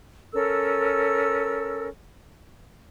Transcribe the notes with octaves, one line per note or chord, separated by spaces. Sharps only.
C#4 A4 A#4 E6